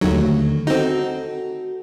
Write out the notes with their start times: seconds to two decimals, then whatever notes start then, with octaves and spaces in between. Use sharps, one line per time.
0.01 D#2 D3 D#3 F#3 A3
0.67 C4 D#4 F#4 A4